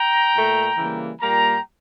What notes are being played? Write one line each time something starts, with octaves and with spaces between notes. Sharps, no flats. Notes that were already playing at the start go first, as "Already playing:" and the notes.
Already playing: G5 A#5
A#2 A3
C#3 E3 G3 A#3
A#2 G3 A#3 G5 A#5